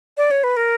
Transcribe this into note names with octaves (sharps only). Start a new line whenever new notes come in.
D5
C#5
B4
A#4